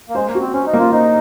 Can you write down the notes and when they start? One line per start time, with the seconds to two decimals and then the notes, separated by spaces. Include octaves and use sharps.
0.09 A#3
0.15 G#3 C5
0.28 A#3
0.35 F#4
0.41 C4
0.54 C#4 C5
0.66 D#4
0.73 A#3
0.79 F4
0.92 D#4 C5